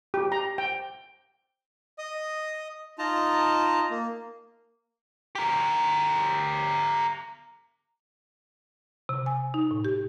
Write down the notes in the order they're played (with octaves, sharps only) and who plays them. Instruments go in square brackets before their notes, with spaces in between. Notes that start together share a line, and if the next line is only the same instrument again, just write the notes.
[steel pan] G4
A#5
G5
[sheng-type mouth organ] D#5 D#6
D#4 F4 D#5 A5 A#5
A#3
[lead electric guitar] G4 A#4
[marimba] C3
G#5
D#4
A2
G4